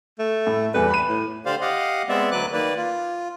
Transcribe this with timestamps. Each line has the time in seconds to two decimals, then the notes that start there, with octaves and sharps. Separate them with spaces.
0.19 A3
0.47 A2
0.74 E2 G3 A3 B4
0.90 B5 D#7
1.09 A2
1.46 D3 G4 C5 D5 F5
1.61 G4 D#5 F5 F#5
2.09 G#3 B3 C4 D5 E5
2.31 D2 F#3 B4 D6 F#6
2.52 D#3 A#3 B4 D5
2.76 F4